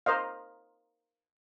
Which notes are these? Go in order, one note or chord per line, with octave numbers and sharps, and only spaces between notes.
A#4 C5 D#5 F5